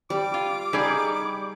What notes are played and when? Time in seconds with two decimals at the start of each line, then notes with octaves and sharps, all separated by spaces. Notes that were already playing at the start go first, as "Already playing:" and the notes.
0.10 G3 D6
0.34 F4
0.73 G3 D#4 G#4 D5